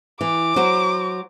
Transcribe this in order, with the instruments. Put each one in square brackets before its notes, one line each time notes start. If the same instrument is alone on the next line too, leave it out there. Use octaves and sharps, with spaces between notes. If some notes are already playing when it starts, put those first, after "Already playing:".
[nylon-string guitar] E3 [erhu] D6
[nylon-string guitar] F#3 F#4 C5